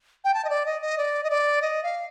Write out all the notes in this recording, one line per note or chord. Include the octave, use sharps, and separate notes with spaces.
G5
A5
D#5
D5
D#5
D#5
D5
D#5
D5
D#5
F5